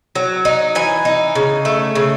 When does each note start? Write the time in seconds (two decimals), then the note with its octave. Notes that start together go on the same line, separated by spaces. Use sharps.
0.15 F#3
0.45 D#4
0.75 E3 G#5
1.05 D#4
1.35 C#3
1.65 A3
1.95 C#3